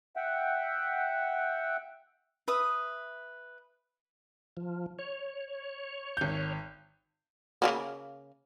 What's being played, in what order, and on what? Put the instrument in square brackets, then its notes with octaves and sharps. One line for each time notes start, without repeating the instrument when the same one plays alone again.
[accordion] E5 F#5 G5
[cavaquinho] B4 E5 D#6
[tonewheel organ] F3
C#5
[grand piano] G#1 G6
[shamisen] C#3 G3 A#3